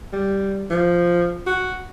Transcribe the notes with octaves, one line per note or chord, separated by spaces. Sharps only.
G3
F3
F#4